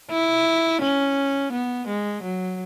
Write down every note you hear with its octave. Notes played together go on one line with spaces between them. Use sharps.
E4
C#4
B3
G#3
F#3